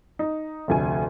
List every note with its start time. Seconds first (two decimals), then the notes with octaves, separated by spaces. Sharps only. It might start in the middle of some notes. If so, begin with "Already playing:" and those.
0.19 D#4
0.68 F1 D2 G#5